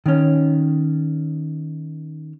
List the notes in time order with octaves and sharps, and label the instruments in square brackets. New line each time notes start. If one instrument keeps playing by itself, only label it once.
[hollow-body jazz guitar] D#3 C#4